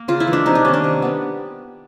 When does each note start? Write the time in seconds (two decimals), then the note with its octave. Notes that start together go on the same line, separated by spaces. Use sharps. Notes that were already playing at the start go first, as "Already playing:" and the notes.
Already playing: A#3
0.08 C#3 F4
0.20 E4
0.27 E3 G#3
0.33 D4
0.46 C3 D#4
0.55 D4
0.65 D#3 G3 A#3 C#4
0.74 D4
0.84 C3
1.02 G3 B3